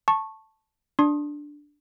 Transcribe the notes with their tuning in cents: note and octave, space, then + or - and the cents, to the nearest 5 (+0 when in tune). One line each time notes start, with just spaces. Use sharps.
A5 +0 C#6 -15
D4 +0 C6 +35 D#6 +0